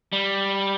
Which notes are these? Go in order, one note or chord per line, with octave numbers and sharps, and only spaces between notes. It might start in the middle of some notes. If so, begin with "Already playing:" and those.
G3